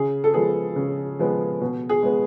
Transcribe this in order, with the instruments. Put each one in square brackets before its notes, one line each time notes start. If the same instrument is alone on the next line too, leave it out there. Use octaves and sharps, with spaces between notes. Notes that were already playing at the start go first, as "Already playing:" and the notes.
Already playing: [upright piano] C#3 G#4
A4
F3 G#3 B3 G#4
C#3
F3 G#3 B3
B2
G#4
G#3 B3